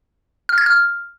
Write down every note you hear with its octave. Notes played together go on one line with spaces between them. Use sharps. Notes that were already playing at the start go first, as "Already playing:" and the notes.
F6
G#6
F6